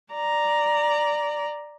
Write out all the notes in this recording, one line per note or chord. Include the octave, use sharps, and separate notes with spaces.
D5 A#5